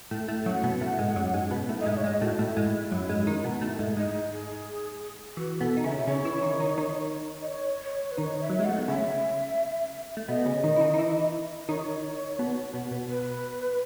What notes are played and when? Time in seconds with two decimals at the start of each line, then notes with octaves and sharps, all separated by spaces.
0.11 A2 A3
0.28 A2 A3
0.46 F#2 F#3 F#5
0.64 B2 B3
0.81 A2 A3
0.99 G#2 G#3
1.16 F#2 F#3
1.34 G#2 G#3
1.51 B2 B3
1.69 A2 A3
1.80 D#5
1.86 G#2 G#3 E5
1.97 C#5
2.03 G#2 G#3 D#5
2.21 A2 A3 F#4
2.39 A2 A3 E4
2.57 G#2 G#3
2.91 F#2 F#3
3.09 G#2 G#3
3.27 D#3 D#4
3.44 B2 B3
3.62 A2 A3
3.79 G#2 G#3
3.97 G#2 G#3 D#4
4.32 G#4
5.37 E3 F#4
5.60 B2 B3 A4
5.77 D#4
5.84 C#3 C#4 E5
6.07 C#3 C#4 C#5
6.25 E3 E4
6.42 D#3 D#4
6.60 D#3 D#4
6.78 D#3 D#4
7.42 D#5
7.47 C#5
7.83 C#5
8.11 B4
8.17 D#3 D#4 C#5
8.41 E5
8.50 F#3
8.59 G#3 E5
8.65 A3 F#5
8.78 B3
8.88 C#3 C#4 E5
10.17 A3
10.28 B2 B3 D#5
10.46 C#3 C#4
10.64 D#3 D#4
10.76 E4
10.81 D#3 D#4
10.94 D#4
10.98 E3 E4
11.69 D#3 D#4 C#5
12.39 B2 B3
12.74 B2 B3
12.91 B2 B3
13.09 B4